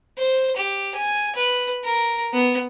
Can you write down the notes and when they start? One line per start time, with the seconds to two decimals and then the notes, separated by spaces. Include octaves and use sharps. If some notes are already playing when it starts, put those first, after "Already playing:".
0.18 C5
0.57 G4
0.95 G#5
1.36 B4
1.84 A#4
2.34 B3